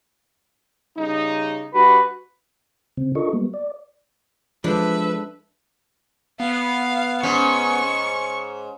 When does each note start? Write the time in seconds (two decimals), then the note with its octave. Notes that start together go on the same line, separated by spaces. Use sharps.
0.96 C#3 G3 D#4
1.74 G3 D4 F#4 B4
2.97 C#3 C4
3.15 D4 F4 A4 A#4 D#5 C#6
3.33 F#3 G3 A#3 B3
3.54 D5
4.64 F3 G#3 D4 A4 B4 E5
6.40 B3 F5
7.23 G#2 C#4 C#6